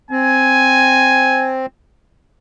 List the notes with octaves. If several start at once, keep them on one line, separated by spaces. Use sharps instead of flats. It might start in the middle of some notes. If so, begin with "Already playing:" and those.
C4 G#5